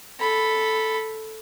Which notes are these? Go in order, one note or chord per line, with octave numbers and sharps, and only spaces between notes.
A4 B5